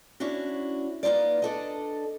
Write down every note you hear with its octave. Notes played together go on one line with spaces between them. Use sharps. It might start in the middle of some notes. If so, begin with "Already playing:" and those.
C#4 D4 E4 F#4
A#3 B3 D#4 F4 D5
D4 A4 D#5